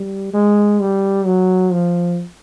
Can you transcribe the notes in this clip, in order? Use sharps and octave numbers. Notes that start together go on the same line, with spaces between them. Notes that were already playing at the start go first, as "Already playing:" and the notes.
Already playing: G3
G#3
G3
F#3
F3